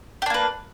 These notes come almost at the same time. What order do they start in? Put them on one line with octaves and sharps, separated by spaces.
G4 D4 A#3 B4